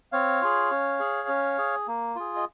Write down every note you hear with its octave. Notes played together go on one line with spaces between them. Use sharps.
C4 C#5 F5
F4 G#4
C#4
G#4
C#4
G#4
A#3
F4 G#4
D#5